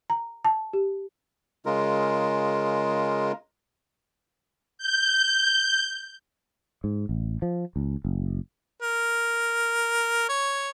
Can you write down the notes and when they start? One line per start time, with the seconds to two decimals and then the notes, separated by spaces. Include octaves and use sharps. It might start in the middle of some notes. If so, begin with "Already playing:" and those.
0.10 A#5
0.45 A5
0.73 G4
1.66 C#3 G#3 F4 A#4
4.78 G6
6.84 G#2
7.09 A1
7.42 F3
7.76 C#2
8.05 F#1
8.82 A#4
10.29 C#5